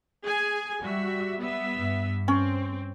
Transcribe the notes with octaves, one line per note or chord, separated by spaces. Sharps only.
G#4 G#5
G3 F#4 E5
B3 E5
G2
C4 C#4